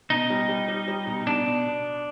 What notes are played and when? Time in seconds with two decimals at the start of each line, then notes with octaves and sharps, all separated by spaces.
0.10 B2 D#4
0.30 G3
0.49 G3
0.68 G3
0.88 G3
1.07 B2
1.27 B2 D4
1.47 B2
1.66 B2